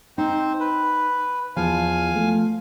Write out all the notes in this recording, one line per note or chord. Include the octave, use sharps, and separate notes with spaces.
C4 D#4 C5
B4
E2 F3 F5 G#5
A3